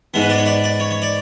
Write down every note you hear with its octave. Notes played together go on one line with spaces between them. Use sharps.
G#2 G#3 B3
B4
D5
C#5
D5
D5
C#5
C#5
D5